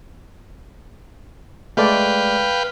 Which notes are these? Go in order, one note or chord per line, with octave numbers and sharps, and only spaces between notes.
G#3 A3 B4 D5 F5 G5